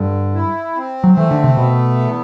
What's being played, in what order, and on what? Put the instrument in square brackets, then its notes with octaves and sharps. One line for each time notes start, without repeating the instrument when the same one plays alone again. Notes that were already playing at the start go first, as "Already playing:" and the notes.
Already playing: [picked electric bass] G2 [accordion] D3
[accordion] E4
C4
[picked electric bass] F#3
[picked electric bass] E3 [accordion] A3
[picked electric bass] D3
C3
[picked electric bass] B2 [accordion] B3
[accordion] E2